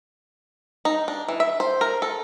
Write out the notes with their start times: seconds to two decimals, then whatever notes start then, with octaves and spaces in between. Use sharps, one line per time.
0.85 D#4
1.08 D4
1.28 E3
1.40 E5
1.60 C5
1.81 A#4
2.02 A4